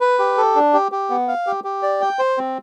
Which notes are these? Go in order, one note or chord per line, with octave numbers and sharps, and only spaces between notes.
B4
G4
A4
D4
G4
G4
B3
F5
G4
G4
D5
G5
C5
C4